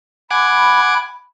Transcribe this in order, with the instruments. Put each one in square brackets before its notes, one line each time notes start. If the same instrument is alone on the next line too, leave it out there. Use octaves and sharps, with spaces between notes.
[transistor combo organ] F#5 G#5 D6 [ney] B5